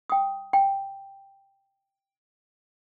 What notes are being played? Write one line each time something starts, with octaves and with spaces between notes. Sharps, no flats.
G5 D#6
G5